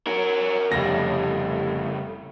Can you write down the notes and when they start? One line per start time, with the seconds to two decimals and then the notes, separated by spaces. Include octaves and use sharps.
0.07 F#4 A#4 C#5 F#5
0.72 F1 A2 C#3 G3 A#6